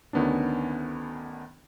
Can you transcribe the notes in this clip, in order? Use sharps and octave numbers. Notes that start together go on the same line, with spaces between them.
D2 D#3 B3 C#4 D4